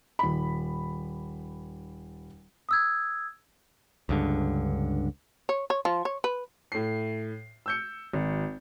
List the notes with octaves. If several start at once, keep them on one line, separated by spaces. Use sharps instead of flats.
D#1 B5
D#6 E6 G#6
C#2 G2 D3
C#5
C#5
F3
C#5
B4
A2 C7
E6 G6 C#7
G#1